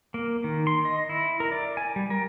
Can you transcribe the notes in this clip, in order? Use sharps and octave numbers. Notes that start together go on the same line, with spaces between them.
A#3
D#3
C6
D#5
E4
A#4
D5
G#5
G3
A#4